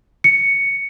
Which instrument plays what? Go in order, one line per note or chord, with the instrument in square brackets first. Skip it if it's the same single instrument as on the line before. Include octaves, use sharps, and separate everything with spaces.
[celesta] C#7